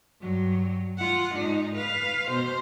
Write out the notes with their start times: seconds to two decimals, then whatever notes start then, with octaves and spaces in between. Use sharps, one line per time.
0.21 G2 F#3
0.98 F4 F#5
1.35 G#2 D#4
1.76 B4 F5
2.28 B2 C5